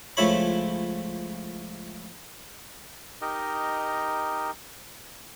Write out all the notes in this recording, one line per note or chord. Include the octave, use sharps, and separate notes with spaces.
C#2 F3 A3 E4 C#5 B5
D#4 G4 A#4 D#5